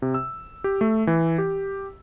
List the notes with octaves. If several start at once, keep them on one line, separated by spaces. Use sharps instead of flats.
C3
E6
G4
A3
E3
G4